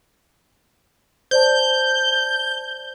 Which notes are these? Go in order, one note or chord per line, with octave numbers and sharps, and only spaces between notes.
C5 D5 A5 G6